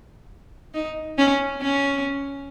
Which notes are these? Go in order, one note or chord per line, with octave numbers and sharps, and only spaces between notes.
D#4
C#4
C#4